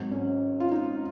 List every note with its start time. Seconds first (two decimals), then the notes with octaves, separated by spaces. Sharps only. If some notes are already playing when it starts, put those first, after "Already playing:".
Already playing: G#1 G#2 F#3
0.11 C#4
0.60 F4
0.71 D#4